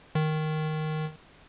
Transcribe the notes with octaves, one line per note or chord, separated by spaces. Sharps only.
D#3